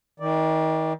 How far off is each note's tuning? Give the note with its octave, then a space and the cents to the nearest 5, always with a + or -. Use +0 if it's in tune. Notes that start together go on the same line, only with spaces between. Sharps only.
D#3 +35 D5 +0